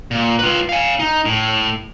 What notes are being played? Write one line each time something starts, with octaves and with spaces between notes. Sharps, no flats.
A#2
F4 B4
F5 G#5
D#4
A2